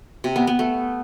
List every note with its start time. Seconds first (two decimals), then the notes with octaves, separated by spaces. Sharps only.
0.24 C3
0.36 B3
0.47 B3
0.59 A3